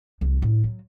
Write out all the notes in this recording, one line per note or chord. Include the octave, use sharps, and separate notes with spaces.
C2 F3
A2
F#3